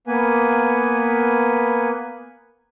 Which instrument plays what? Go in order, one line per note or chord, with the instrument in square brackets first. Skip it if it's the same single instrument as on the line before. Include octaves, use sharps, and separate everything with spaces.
[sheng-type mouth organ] A#3 B3 B4 G#5